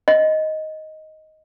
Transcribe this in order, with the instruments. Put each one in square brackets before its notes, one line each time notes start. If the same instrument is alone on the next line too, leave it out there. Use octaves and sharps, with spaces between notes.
[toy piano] D#5